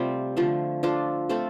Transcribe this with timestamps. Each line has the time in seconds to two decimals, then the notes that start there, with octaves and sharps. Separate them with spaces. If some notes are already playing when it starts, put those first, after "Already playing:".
Already playing: C3 G3 A3 C4 F4
0.37 D3 F3 A3 F4
0.83 F3 D4 F4 A4
1.29 A3 C4 F4 A4